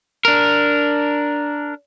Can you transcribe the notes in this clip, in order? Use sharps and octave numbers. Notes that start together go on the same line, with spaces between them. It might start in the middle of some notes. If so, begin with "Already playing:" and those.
D4 A#4